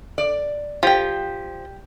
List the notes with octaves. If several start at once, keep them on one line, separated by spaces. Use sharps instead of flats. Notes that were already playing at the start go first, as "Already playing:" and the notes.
D5
F3 G4 G5